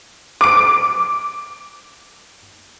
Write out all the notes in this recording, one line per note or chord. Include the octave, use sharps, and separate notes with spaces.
D6 D7